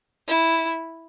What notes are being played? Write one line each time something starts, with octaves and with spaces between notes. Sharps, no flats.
E4